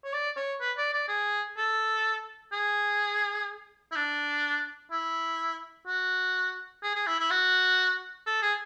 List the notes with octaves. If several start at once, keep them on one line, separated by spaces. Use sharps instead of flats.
C#5
D5
C#5
B4
D5
D5
G#4
A4
G#4
E4
D4
E4
F#4
G#4
G#4
E4
E4
F#4
A4
G#4